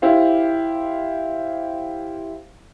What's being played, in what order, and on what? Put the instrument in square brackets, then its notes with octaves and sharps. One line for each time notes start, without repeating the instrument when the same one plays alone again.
[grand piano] E4 G4 C5 F5